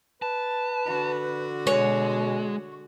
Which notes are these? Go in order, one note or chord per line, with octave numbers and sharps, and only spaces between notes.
B4 A5
D3 F#4
B2 G#3 C#5